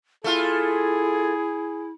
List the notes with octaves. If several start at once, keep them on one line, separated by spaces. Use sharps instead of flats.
A3 E4 F4 G#4